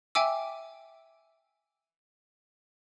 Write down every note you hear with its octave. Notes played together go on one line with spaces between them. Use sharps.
E5 G5 G#5 D6 E6